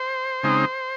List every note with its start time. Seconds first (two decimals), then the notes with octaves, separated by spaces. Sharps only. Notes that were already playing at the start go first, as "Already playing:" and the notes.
Already playing: C5
0.43 C#3 G#3 C4 D#4